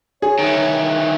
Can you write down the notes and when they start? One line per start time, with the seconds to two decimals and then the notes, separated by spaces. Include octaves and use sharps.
0.22 G#4 C#5
0.39 D#3 E3